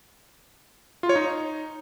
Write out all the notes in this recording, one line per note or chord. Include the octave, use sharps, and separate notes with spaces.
F4
C#5
D#4